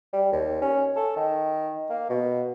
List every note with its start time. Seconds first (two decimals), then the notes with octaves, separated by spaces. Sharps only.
0.13 G3
0.32 D#2
0.61 C#4
0.96 A4
1.17 D#3
1.90 A#3
2.09 B2